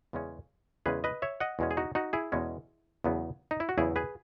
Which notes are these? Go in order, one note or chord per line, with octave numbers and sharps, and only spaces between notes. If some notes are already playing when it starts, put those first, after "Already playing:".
E2 C#3 G#3 C#4
E2 C#3 G#3 C#4 G#4 B4
B4 D#5
C#5 E5
D#5 F#5
E2 B2 G#3 C#4
G#4
D#4 F#4
D#4 F#4
E4 G#4
E2 B2 G#3 C#4
E2 C#3 F#3 B3
D#4
E4
F#4
E2 C#3 F#3 B3 E4 G#4
G#4 B4